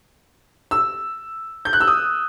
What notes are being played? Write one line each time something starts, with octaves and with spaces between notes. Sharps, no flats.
E6
G6
F#6
E6
D#6